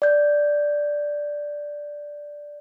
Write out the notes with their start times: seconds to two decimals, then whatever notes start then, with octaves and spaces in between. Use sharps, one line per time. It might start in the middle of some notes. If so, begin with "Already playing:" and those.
0.02 D5 G6